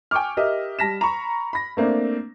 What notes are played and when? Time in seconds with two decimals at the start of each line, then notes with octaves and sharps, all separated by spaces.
0.11 G5 G#5 C#6 D6 F6
0.37 G4 A#4 D#5 E5
0.79 G3 A5 A#6 B6 E7
1.01 A#5 B5 C#6
1.53 B5 A#6
1.77 A3 A#3 C4 D4